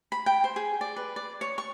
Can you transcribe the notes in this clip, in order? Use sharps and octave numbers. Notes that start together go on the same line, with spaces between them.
B5
G5
C5
G#4
D5
B4
D5
C#5
C#6